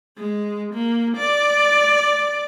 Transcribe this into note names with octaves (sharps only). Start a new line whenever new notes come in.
G#3
A#3
D5